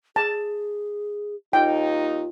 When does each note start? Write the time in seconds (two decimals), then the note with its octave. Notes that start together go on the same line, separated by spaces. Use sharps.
0.16 G#4 A5
1.53 D#2 D#4 F4 G5